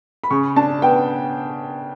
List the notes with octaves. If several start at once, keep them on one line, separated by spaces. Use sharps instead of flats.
B5
C#3 C#6
D4 A5
B3 G5